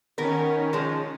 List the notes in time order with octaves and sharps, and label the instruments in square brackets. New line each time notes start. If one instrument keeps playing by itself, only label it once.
[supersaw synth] D#3 C#4 [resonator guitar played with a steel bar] B3 A#4
[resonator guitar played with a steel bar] F3 G#3